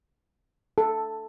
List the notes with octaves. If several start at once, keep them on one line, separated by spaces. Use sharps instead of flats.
A4